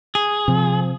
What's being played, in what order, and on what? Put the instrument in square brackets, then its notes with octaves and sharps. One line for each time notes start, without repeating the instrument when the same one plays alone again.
[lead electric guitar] G#4
[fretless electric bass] C3 [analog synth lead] F3